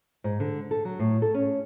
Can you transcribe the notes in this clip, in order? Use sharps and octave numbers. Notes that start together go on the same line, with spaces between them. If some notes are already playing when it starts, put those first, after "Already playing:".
G#2
D3
A4
F#3
A2
A4
C#4